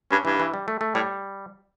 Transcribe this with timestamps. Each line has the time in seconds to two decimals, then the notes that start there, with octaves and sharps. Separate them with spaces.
0.11 G2 C#4
0.25 G2 E3
0.40 E3
0.54 G3
0.68 A3
0.81 A3
0.95 A2 G3